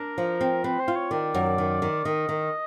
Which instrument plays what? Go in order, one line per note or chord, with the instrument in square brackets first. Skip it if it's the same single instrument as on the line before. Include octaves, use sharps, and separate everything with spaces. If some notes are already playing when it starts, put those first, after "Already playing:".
Already playing: [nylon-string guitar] D4 [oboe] A#4
[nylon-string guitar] F3
C4
[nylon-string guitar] C4 [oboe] B4
[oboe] C5
[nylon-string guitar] F4
[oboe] C#5
[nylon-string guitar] D#3 [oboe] D5
[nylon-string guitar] F#2
D#3
D#3
[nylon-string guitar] D#3 [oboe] D#5
[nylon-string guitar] D#3